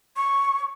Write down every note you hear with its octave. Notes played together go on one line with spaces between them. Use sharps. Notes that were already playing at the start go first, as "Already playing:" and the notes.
C#6